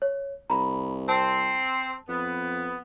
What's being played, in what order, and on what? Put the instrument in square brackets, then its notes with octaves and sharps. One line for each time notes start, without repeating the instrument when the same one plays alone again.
[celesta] C#5
[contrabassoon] C2 [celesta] A#5 B5
[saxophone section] C4 [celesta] A5
[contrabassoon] F2 [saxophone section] B3